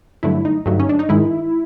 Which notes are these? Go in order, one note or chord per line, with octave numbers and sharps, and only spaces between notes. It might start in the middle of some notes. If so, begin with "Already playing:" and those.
G2 D3 F#3 A3 E4
D#4
G2 D3 F#3 A3
C#4
D4
D#4
G#2 D#3 G#3 E4